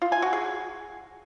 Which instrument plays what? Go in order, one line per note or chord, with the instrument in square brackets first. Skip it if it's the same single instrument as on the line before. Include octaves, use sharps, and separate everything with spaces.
[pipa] F4
G#5
F#4
G#4